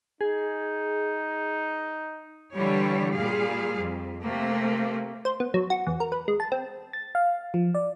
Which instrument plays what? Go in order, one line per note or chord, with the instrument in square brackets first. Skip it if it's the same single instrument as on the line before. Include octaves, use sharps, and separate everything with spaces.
[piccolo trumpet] D#4 [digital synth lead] G#4
[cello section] D3 E3 G3 C#5
A#2 G3 G#4 F5
F2
C3 A3 A#3
[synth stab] C5
B3
F#3
F#4
E2
A#4
B4
G#3
A5
C4
[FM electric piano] A6
F5
F3
D5